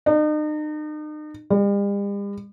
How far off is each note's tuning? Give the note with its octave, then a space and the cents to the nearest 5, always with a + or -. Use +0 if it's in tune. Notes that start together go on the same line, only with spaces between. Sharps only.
D#4 -40
G3 +45